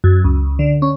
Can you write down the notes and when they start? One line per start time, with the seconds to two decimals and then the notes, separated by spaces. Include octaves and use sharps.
0.04 F#2
0.24 C#2
0.59 D3
0.82 C#4